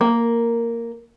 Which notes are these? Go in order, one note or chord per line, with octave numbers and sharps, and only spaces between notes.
A#3